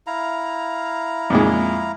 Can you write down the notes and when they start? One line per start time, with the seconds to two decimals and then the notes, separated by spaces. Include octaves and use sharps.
0.07 E4 F5 A#5
1.30 F2 A#2 G#3